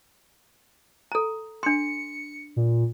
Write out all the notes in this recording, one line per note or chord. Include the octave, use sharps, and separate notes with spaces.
A4 A#5
D4 C6 C#7
A#2